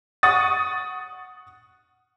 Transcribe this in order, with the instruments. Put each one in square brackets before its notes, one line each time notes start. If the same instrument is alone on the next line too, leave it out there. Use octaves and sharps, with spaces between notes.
[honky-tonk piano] F#5 C#6 D#6 A6